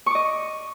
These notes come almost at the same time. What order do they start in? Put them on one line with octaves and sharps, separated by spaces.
C#6 D6 D#5